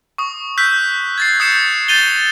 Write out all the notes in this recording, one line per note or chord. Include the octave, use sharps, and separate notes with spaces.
C#6 D#6
E6 F#6 G6 B6
G#6 A6 C7
D#6 G6 C7 C#7 E7
G6 A6 D#7 F7 G7